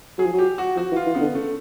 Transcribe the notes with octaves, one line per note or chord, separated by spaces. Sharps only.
F#3 G#4
F3
F#3
G4
F#4
F3 F#4
E3
F4
E3
C#3 B3
D3
C#3 A3